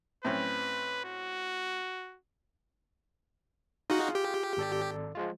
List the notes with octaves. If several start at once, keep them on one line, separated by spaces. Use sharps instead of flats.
A2 C4 C#4 B4
F#4
D#4 F4 F#4 G#4 F5
G4
G#1 A4 D5
F3 G#3 F4